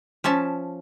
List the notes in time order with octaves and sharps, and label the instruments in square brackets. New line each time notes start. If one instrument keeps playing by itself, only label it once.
[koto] F3 C#4 E5 A5